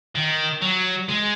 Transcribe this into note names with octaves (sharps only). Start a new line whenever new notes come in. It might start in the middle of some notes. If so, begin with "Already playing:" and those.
D#3
F#3
G#3